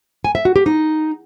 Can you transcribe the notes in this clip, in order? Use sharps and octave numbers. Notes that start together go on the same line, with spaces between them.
G#5
E5
F#4
G4
D#4